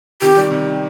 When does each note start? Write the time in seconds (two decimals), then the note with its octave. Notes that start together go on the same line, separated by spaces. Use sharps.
0.22 C3 D#3 G4
0.37 D#3 G3
0.51 C3 D#3